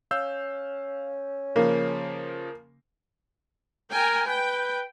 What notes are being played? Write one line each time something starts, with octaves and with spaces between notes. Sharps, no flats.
C#4 F5 E6 G6
C#3 F3 A#3
A#4 G5 G#5
B4 G5